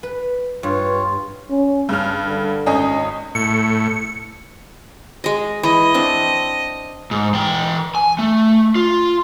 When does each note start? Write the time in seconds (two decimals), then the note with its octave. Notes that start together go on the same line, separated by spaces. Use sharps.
0.03 B4
0.63 G2 F4 C#5
1.50 C#4
1.89 G2 C#3 F6
2.24 D3
2.66 G#1 C#4 D#5
3.35 A2 C#7
5.24 G#3 D#5
5.63 E3 D#5
5.94 C4 D4
7.11 G#2
7.34 E3 G5
7.95 G#5
8.19 A3
8.75 F4